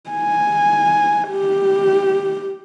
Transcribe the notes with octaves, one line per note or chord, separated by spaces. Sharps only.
G#5
G4